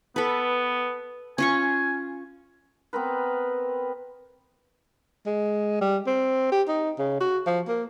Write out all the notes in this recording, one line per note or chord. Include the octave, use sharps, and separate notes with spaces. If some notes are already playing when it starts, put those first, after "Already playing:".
B3 A4 B4
C#4 F4 G#5 C#6
B3 C4 A#4 B4
G#3
G3
C4
G4
D#4
C#3
F#4
F3
A#3